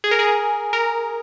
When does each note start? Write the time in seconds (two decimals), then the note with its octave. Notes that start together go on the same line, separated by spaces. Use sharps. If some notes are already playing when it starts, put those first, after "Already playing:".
0.04 G#4
0.11 A#4
0.19 G#4
0.73 A#4